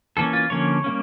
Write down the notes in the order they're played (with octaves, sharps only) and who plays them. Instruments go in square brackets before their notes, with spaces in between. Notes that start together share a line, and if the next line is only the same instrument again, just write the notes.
[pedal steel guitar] E3 A#3 C#4 A4
F4
D3 F3 A#3 C#4 C#5
G3 A#3 C#4